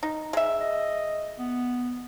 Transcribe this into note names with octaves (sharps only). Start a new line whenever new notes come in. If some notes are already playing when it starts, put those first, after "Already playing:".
D#4
G#3 E5
D#5
B3